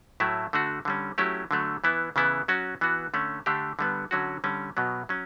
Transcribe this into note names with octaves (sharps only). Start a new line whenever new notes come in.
A2 F#3 A3 E4
D3 A3 D4 F#4
D3 G3 C#4
F#3 A3 C#4 E4 G4
D3 F#3 A3
E3 B3 E4
C#3 E3 B3 E4
F#3 C#4 F#4
E3 B3 F#4
D3 A3 C#4
D3 A3 D4 G4
D3 G3 B3
D3 F#3 C#4 F#4
D3 G3 C#4
B2 F#3 B3
F#3 C#4